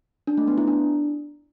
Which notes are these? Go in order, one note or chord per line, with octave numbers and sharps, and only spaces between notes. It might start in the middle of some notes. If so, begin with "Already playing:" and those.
D4
A3
B3
E4
D4